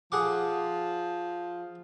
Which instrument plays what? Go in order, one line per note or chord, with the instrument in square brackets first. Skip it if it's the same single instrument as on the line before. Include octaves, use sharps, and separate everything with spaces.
[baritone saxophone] F3 [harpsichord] G#4 F#5 D6